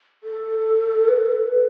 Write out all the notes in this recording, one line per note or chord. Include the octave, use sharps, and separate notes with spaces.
A4
B4
A4
B4
A4
B4